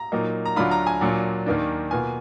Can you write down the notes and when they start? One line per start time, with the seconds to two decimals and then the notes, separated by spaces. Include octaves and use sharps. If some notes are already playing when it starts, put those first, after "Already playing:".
Already playing: A#5
0.12 A#2 F#3 A#3 D#4
0.45 A#5
0.56 D2 D3 F#3 D4 F4 B5
0.71 A#5
0.87 G#5
1.01 A#2 F#3 D4 F4
1.46 D#2 D#3 A#3 D4
1.91 B2 A#3 F4 G#5